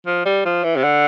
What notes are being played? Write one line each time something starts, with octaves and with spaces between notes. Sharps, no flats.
F3
G3
F3
E3
C3
D3